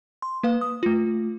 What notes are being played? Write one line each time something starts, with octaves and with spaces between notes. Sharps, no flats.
C6
A#3 B4 F5
D#6
A3 F4